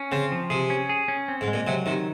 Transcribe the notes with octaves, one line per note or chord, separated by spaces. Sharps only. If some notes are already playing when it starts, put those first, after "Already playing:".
Already playing: C#4
C#3 C4
F3
C3 G#4
C#4
G#4
C#4
C4
G#2
G#3
A#2
C3 F#3
C3 D#3